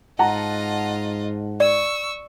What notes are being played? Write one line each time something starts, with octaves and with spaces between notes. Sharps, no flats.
G#2 F4 D#5 F#5 A5 A#5
D5 C#6 E6